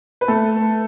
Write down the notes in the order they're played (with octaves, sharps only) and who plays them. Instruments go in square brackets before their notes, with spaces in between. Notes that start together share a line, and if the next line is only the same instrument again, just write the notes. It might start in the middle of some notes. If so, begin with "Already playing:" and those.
[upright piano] B4
A3 A4